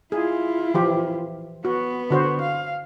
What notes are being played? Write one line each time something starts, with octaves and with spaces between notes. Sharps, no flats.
E4 F4 G#4
E3 F3 G4
B3 F#4
D3 F#4 C5
F5